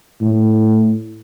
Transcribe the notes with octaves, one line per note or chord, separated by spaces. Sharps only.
A2